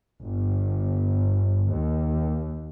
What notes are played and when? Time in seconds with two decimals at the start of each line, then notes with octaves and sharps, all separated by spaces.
0.21 G1
1.72 D#2